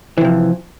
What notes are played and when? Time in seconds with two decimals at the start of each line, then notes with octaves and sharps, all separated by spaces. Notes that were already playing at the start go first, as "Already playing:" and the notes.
0.18 E3
0.21 C3
0.25 F3